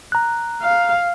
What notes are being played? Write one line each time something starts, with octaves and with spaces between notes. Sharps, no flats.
A#5 F#6
F5